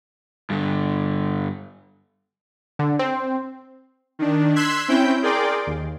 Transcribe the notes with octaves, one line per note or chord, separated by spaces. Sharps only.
G2 D3
D3
C4
D#3 D4
C6 E6 F#6 G#6 B6
C4 C#4 E4 G5 G6
G#4 A#4 D5 G5 C6 D6
D#2